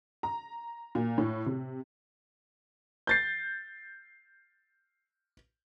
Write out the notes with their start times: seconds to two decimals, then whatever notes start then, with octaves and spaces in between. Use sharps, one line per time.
0.23 A#5
0.95 A#2
1.18 A2
1.46 C3
3.07 G6 A6 C7